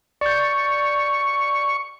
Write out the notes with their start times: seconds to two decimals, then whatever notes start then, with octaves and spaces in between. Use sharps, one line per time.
0.21 D5 C#6 G6